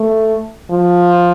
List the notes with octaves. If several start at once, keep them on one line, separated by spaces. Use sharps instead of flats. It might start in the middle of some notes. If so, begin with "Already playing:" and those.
Already playing: A3
F3